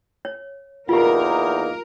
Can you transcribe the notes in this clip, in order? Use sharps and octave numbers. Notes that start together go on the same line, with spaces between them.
C#5
E2 A#3 D#4 F4 G4 A#4